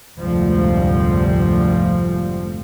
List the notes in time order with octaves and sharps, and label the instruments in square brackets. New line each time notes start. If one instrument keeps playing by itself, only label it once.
[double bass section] F1 D2 G#2 F3 G3 C4